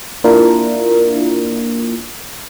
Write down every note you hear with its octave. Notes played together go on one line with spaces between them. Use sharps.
A#3 D4 E4 F4 A#4